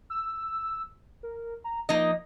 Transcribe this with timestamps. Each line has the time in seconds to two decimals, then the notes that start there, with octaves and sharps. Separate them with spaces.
0.10 E6
1.23 A#4
1.64 A#5
1.89 F3 A#3 D#4 D#5